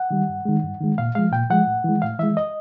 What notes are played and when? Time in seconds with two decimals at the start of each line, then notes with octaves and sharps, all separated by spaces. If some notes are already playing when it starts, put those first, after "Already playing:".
Already playing: F#5
0.11 D#3 G3
0.29 G2
0.45 D#3 G#3
0.63 G2
0.81 D#3 G#3
0.98 A#2 F5
1.15 F3 G#3 F5
1.32 A#2 G5
1.50 F3 G#3 F#5
1.67 A2
1.84 E3 G#3
2.02 A2 F5
2.19 E3 G#3 E5
2.37 D#5